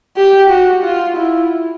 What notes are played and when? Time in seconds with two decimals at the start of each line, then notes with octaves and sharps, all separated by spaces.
0.17 G4
0.50 F#4
0.84 F4
1.17 E4